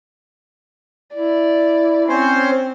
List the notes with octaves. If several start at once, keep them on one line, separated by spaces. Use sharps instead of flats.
E4 D5
C4 C#4 C5